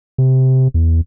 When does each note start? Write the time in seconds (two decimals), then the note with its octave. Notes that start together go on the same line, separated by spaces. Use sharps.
0.18 C3
0.74 E2